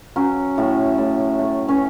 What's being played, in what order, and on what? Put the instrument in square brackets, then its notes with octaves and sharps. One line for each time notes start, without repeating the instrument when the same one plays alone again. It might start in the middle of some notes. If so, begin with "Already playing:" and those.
[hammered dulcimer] F#3 C#4
A2
A2
A3
C#4